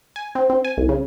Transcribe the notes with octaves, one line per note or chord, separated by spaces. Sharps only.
G#5
C4
C4
G#5
C2
C#3